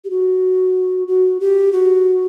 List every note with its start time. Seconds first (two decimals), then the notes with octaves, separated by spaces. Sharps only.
0.05 G4
0.10 F#4
1.08 F#4
1.40 G4
1.72 F#4